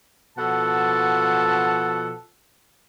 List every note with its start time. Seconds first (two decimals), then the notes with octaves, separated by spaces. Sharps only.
0.37 B2 F3 A4 F#5 A5